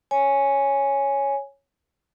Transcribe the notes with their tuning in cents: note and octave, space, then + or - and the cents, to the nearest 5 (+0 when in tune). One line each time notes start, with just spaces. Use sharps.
C#5 +0 G#5 +0